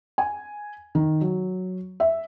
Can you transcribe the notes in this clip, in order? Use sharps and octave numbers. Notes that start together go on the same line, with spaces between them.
G#5
D#3
F#3
E5